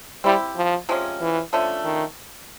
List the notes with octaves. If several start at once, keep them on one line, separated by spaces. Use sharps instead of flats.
G3 C4 E4 G4
F3
C3 F3 G#3 C#4
E3
D3 F3 A3 C#4
D#3